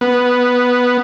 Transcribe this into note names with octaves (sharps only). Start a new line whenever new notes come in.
B3